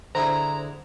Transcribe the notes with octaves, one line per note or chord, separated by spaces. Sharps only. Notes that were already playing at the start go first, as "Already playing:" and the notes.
D3 E4 G#4 C5 A#5